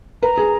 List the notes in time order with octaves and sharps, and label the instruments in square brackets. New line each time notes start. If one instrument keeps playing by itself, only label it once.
[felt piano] B4 [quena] A#5
[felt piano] G#4